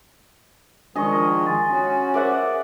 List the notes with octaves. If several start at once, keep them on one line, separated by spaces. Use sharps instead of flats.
D#3 F3 G#3 D4 G#4 D#5 C#6
G#5 C6 A6
C#4 F#4
G#4 A#4 C5 D5 E5 F#5